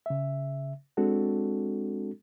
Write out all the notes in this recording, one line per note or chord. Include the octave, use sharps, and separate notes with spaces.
C#3 E5
G#3 C4 D4 F#4 A4